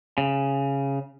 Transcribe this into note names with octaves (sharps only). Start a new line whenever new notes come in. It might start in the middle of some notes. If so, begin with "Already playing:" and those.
C#3